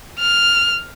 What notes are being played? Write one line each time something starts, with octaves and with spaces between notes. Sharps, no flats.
F6